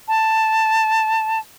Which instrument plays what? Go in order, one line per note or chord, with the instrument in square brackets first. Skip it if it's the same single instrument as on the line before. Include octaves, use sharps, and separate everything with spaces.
[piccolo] A5